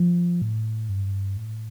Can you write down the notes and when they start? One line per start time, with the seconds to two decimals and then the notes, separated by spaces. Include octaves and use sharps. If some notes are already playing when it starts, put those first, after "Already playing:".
Already playing: F3
0.42 A2
0.89 G2
1.37 A2